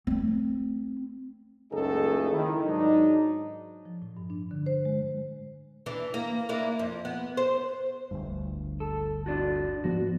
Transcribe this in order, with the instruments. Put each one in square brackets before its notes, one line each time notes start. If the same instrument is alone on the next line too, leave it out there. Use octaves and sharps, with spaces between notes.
[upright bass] A3 C4
[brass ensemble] F#1 C#2 A3 D#4 G#4 A4
D#3 E4
G#2 F#3 D4 D#4
[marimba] F3
A2
G2
D4
D3
C5
G#3
[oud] E3 D4
A#3
A#3 D4 E4
F2
B3
C5
[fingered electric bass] G1 D2 G2
[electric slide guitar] A4
D4 F4 F#4
[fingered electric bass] G#2 F3 B3 [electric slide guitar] F#4